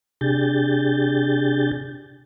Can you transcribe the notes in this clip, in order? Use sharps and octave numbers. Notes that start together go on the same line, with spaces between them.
C3 D4 G4 G#4 G6 A6